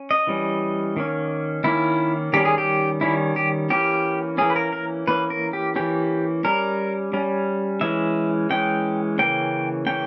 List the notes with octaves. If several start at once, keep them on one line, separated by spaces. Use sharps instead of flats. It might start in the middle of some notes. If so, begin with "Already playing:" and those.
Already playing: C#4
D#5
E3 G3 C#4
D#3 A#3 C#4
D#3 A#3 C#4 E4
D#3 G3 C#4 G4
G#4
G4
D#3 G3 C#4 E4
G4
E3 A#3 C#4 G4
E3 A#3 C#4 G#4
B4
A#4
A#4
E3 A#3 C#4 B4
A#4
G4
E3 A#3 C#4 G4
G3 C#4 A#4
G3 C#4
E3 G#3 C#4 E5
E3 G#3 C#4 G5
C#3 E3 A#3 C#4 G5
C#3 E3 A#3 C#4 G5